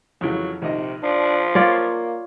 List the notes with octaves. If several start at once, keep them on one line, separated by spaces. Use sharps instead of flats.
F2 C#3 E3 F#3
A#1 C3 D#3 D#5
F3 D4
A#3 F4 C#5 D5